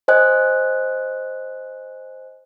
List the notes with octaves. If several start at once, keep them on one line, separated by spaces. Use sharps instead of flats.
C5 D#5 G#5 F#6